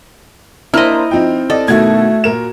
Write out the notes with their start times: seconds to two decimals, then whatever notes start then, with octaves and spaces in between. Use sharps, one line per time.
0.74 A#3 D4 E4 C5 D#5 A#5 F6
1.11 F3 C4 D#4 G5
1.50 A4 D5 D#5
1.68 B2 D#3 A3 F#4 G#6
2.24 A#2 A#4 E7